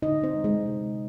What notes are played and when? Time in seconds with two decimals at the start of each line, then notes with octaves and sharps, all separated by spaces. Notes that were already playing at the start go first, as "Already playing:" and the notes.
0.02 D3 D#4 D#5
0.23 C4 C5
0.34 G#3
0.44 G#3 G#4
0.65 C3